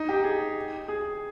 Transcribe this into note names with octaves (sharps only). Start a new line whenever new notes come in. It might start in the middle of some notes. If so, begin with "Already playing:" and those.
Already playing: D#4
G4
G#4
G#4